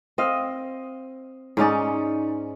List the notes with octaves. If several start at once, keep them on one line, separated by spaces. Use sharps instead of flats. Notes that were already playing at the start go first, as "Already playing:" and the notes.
C4 D#5 F5
G#2 C#4 D#4 D5